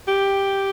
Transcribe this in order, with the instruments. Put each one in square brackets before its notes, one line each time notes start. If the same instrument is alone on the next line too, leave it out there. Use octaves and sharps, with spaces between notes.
[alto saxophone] G4